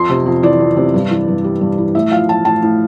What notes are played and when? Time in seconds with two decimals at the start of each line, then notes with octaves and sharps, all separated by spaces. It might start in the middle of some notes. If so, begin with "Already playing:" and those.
Already playing: F2 C6
0.09 C3
0.26 F2
0.43 E3 D5
0.60 F2
0.77 C3
0.94 G2
1.10 E3
1.28 G2
1.44 G3
1.61 G2
1.78 E3
1.95 A2 E5
2.11 F3 F5
2.29 F3 A5
2.45 A2 A5
2.62 A2